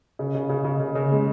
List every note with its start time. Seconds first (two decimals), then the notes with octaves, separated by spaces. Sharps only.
0.19 C#3
0.35 C#3
0.49 C#3
0.64 C#3
0.80 C#3
0.95 C#3
1.12 G#3